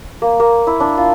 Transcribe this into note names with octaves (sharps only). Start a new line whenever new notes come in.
A#3
A#3
E4
D4
F4